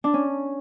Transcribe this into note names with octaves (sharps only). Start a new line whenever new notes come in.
D4
C#4